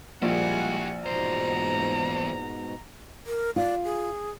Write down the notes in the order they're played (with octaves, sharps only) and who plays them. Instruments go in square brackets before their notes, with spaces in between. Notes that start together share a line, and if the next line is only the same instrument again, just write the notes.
[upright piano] A#1 [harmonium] G3 G#3 A#3 [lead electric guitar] E4 G4 [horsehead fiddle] F#5 G#5
[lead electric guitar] E2 C5 [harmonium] G#2 B2 [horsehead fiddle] A#5
[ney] A#4
[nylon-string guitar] F4 [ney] D5
[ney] G#4